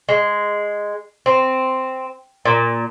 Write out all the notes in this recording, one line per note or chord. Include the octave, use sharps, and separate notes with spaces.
G#3
C4
A#2